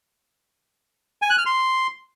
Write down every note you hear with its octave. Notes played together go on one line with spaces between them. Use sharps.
G#5
F#6
F6
C6